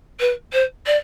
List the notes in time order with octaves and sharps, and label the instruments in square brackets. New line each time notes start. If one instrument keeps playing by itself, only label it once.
[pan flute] B4
C5
D5